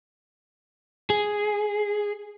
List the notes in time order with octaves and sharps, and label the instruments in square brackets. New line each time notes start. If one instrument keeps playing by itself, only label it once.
[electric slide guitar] G#4